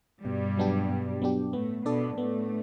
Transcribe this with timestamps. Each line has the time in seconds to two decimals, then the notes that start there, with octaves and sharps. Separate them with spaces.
0.24 G2 B2 G3
0.57 F#3 B3 D4 G4
0.88 B2
1.22 F#3 B3 D4 G4
1.53 A2 A3 B3
1.85 B2 B3 D4 A4 D5
2.18 A2 A3 B3